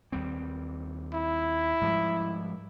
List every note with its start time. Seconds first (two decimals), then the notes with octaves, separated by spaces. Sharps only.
0.12 D#2 G3 C4
1.14 E4
1.81 G#2 F3 G3